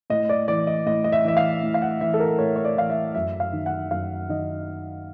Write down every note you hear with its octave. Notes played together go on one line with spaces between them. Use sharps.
A2 D#5
D5
E3 D5
D#5
A2 D#5
D#5
E5
E3 E5
F5
A2
F5
F#5
E3 E5
A4
A#4
A2 C#5
C#5
D5
E3 F5
E5
F#2 E5
F5
D#3
F#5
F#2 F5
D#3 D#5